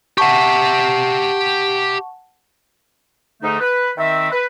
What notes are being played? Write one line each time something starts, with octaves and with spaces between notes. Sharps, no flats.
G4 E5 F#5 A5 C#6
G#2 D3 A3 D#4
B4
D#3 C4 E5
B4